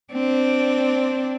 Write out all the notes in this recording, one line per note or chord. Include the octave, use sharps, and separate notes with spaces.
C4 D4